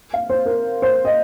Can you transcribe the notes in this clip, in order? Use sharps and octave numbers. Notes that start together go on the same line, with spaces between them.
F5
C5
A#4
C5
D#5